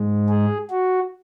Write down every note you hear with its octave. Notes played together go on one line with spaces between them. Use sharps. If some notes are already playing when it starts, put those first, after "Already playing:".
Already playing: G#2 G#3
G#4
F#4